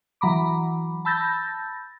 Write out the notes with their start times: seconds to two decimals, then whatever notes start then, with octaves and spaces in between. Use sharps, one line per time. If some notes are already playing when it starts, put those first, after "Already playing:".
0.21 E3 F#3 A#5 B5 D6
1.05 A5 B5 E6 G6 A6 A#6